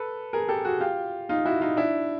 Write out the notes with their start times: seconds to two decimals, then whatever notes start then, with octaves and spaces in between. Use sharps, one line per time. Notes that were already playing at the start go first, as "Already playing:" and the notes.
Already playing: A4 B4
0.33 G#4 A#4
0.48 G4 A4
0.65 F#4 G#4
0.80 F4 G4
1.29 D#4 F4
1.45 E4 F#4
1.61 D#4 F4
1.77 D4 E4